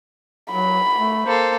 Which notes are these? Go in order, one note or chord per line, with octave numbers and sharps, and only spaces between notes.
F#3 B5
A3
A#3 A4 C5